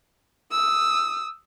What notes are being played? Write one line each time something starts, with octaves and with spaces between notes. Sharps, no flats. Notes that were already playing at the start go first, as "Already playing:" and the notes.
D#6 E6